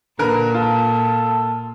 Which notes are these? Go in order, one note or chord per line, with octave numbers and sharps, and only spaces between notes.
A#2 D3 A#4 B4 A#5
F4 A4